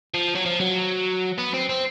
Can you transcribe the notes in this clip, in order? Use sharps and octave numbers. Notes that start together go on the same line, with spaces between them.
F3
F#3
F3
F#3
B3
C4
C4